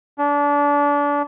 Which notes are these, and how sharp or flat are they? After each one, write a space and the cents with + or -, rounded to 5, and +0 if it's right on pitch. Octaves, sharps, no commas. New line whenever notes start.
D4 -30